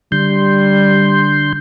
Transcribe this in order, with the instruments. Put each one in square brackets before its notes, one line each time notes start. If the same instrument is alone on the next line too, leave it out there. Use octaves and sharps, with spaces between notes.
[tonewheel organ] D3 C6 G6 [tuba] G3